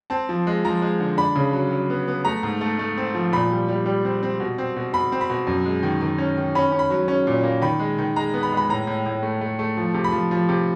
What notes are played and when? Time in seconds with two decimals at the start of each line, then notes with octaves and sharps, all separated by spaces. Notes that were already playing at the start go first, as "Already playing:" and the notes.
0.10 C4 A5
0.29 F3
0.47 G#3
0.65 F3 A#5
0.82 G#3
1.00 D3
1.17 D4 B5
1.35 C#3
1.53 F#3
1.71 F#3
1.90 B3
2.08 B3
2.25 A3 A#5
2.43 G#2
2.61 A3
2.79 A3
2.97 C4
3.14 F3
3.32 A#2 B5
3.50 G3
3.68 G3
3.86 G3
4.05 C4
4.23 C4
4.40 B2
4.58 C4
4.76 B2
4.93 B2 B5
5.12 C4
5.21 B5
5.30 B2
5.47 F#2
5.65 G#3
5.83 D#3
6.01 D#3
6.18 C#4
6.37 D#3
6.55 C#4 B5
6.72 C#4
6.79 B5
6.90 F#3
7.08 C#4
7.27 A#2
7.44 A#3
7.62 D#3 B5
7.79 G#3
7.99 D#3
8.16 G#3 A#5
8.34 B3
8.43 B5
8.52 G#3
8.57 B5
8.69 A2 A#5
8.87 A2
9.06 A2
9.23 A3
9.41 A3
9.59 A3
9.77 F3
9.94 C3
10.04 B5
10.12 F3
10.31 F3
10.49 C3